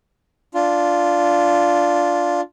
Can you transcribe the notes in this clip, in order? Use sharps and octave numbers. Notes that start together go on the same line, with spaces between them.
D4 F4